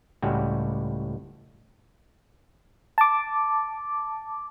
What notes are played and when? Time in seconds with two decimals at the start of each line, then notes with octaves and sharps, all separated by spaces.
0.22 C#2 A2 G3 F#4 G4 G#5
2.98 A5 D6